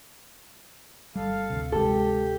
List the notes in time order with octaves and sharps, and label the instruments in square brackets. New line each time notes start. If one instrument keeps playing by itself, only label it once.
[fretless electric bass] G1 G3 [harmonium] A4 F5
[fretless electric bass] D2 C3
[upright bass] G2 G#3 [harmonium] G4 [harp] A4